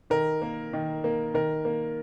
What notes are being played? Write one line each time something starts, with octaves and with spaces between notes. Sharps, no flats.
D#3 A#4
A#3
D#3
A#3
D#3 A#4
A#3